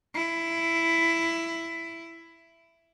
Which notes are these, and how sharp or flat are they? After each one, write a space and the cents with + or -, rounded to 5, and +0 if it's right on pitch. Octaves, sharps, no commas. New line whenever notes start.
E4 +10